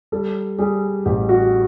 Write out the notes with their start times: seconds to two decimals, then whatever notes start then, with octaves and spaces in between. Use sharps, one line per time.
0.12 G3 A4
0.59 G3 G#4
1.06 A1 G4
1.29 F#4